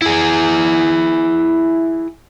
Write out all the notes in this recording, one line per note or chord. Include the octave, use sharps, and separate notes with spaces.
E4 G#4